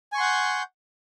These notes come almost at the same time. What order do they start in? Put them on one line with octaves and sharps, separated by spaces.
G#5 C#6 C6 F#5 G6